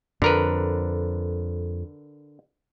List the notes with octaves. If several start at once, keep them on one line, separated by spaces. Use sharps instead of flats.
F2 D3 A#4 B4